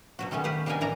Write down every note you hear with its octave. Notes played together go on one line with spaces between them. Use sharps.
B2 F#3 F#4
D#3 G3 A3 B3 C#4
G4 B4 F5 F#5
G3 A#3 D4 D#4 A#4 G#5
A2 E3 D4 A#4 A#5